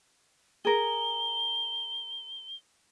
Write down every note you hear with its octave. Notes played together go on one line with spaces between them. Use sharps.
G#4 A#4 G7